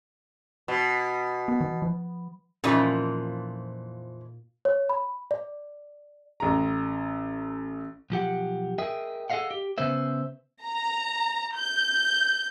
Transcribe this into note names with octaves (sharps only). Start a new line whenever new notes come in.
B2
B3
E3
F3
F2 A#2 E3 F3 C#4 D#4 D#5
C#5
B5
D5
A1 A#5
B1 F3 G4 F#5
G#4 A#4 D#5 E5 G5
G#4 A4 D5 D#5 F5 F#5
G4
C#3 B3 C#4 B4 C5 E5
A#5
G6